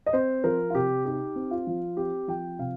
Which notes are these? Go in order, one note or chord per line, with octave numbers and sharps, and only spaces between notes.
D#5
C4 C5
F3 A#4
F4
C3 G4
D#4 G4
C4
F4
F3
C4 G4
F3 G5
C3 F5